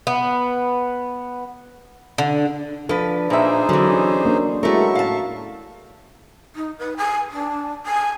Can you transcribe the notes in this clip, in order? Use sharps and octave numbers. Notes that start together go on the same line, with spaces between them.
B3
D3
F3 D4 A4 B4
A#2 D#4 G#4 C5 E5
D3 E3 F#3 C#4
A#3 D4
G#3 A3 C#4 E4 F#4 A#4 E5 C#6
A2 F5 A5
D#4
B4
G#5
D4
G#5